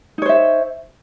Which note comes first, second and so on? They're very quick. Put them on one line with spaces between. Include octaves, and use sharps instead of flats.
D#4 C#5 C5 E5